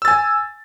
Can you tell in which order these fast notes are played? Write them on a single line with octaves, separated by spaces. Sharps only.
E6 A6 G#5